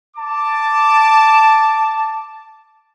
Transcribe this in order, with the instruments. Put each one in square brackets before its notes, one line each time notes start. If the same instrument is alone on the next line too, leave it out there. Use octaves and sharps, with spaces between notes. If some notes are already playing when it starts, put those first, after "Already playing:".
[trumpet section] A5 D6